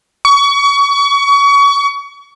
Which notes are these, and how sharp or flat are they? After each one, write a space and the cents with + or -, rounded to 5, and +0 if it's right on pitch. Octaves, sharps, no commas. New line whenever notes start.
C#6 +30